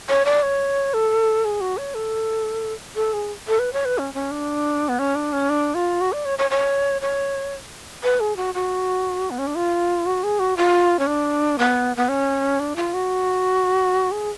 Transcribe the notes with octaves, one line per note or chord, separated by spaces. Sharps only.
C#5
D5
C#5
A4
G#4
F#4
C#5
A4
A4
G#4
A4
B4
C#5
B4
C#4
C#4
D4
B3
C#4
D4
C#4
D4
F4
F#4
D5
C#5
C#5
C#5
C#5
B4
G#4
F#4
F#4
B3
C#4
D4
F4
F#4
G#4
F#4
F4
C#4
D4
B3
B3
C#4
D4
F4
F#4
G#4